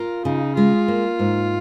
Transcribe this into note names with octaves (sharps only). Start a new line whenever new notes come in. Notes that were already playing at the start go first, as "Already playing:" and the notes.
Already playing: F4 A#4
C#3 D#4
G#3 F4
A#3
G#2